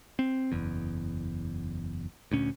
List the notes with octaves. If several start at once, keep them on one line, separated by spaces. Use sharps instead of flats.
C4
F#1 E2
D2 A#2 C#4